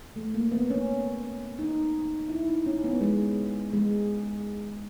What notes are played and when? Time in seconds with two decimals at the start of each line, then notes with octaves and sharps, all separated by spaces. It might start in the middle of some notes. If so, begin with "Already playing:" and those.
0.16 A3
0.34 A#3
0.51 B3
0.70 C#4
1.59 D#4
2.29 E4
2.48 D#4
2.66 C#4
2.84 B3
3.01 G#3
3.73 G#3